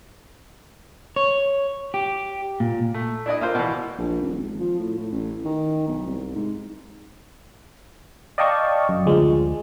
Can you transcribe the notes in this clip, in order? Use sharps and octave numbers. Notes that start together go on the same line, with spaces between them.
C#5
G4
A#2
A3
D4 E4 A4 D5 D#5 D#6
A#3 F4 C5
B2 E3
A#1
D#1
G#1
F3
A2
A2
A1
D#3
B1
C2
G#2
D5 D#5 F5 G5 A5 C#6
F#2
D2 F3 G#3